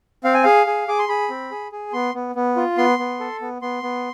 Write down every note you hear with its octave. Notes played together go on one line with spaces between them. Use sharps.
C4 F5
G#5
G#4 F5
G#4
G#4 D6
C6
G#4 B5
C4
G#4
G#4
B3 C6
B3
B3
F4
B3 C6
B3
A4
B3
B3 C6
B3